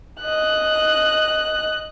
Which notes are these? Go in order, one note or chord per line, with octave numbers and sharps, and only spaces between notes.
D#5 F#6